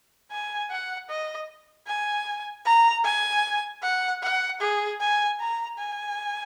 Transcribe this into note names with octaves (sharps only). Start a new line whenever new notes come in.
G#5
F#5
D#5
G#5
A#5
G#5
F#5
F#5
G#4
G#5
A#5
G#5